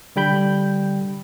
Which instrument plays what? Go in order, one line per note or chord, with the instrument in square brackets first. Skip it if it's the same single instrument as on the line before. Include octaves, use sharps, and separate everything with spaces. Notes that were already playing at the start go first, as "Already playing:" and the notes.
[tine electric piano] D3 G3 G5 B5 G6